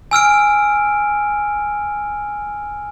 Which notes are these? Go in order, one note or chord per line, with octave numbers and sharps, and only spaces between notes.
G#5 E6 F6 D7